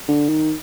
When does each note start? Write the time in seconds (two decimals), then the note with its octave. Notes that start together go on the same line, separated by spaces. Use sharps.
0.08 D3
0.29 D#3